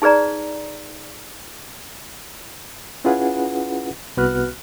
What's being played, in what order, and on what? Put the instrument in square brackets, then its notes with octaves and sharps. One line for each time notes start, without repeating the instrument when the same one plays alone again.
[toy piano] D#4 G#4 B4 D5 A#5
[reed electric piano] C#4 E4 F4 G#4 B4 F#5
C2 B3 F#4 B4 F6 F#6